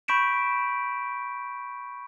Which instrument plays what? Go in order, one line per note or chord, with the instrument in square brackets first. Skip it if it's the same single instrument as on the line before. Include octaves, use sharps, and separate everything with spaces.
[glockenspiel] B5 C#6 G6 B6 D7 E7